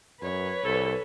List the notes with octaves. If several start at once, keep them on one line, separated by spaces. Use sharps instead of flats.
F#2 B4 C#5
C2 A4